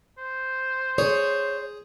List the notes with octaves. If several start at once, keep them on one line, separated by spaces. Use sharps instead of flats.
C5
G#4 C#5